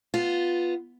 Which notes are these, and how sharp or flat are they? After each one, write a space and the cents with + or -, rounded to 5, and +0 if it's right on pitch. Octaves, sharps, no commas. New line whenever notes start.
B3 +0 F4 +0